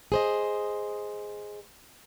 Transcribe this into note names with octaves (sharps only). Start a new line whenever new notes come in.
G#4 C5 D#5